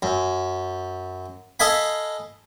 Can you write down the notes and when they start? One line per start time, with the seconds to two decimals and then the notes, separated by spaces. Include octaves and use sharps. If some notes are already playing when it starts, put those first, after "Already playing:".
0.02 F#2
1.60 A4 D#5 F5 G#5 B5